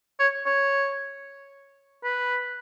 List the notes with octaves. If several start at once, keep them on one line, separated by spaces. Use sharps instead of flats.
C#5
C#5
B4